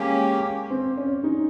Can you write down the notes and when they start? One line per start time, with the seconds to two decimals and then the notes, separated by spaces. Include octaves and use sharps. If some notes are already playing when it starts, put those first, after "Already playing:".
Already playing: G#3 A#3 C#4 G4
0.70 C4
0.97 C#4
1.24 D#4